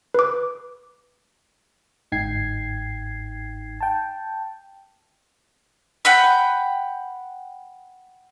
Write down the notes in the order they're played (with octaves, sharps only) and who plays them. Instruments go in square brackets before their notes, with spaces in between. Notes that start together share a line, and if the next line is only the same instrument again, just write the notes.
[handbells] B4 D6
[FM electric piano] G1 G#2 D#4 G5 G#6 C7
G5 A5
[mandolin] F#5 G5 B5